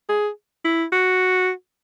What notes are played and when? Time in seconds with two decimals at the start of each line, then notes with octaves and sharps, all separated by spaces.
0.09 G#4
0.65 E4
0.92 F#4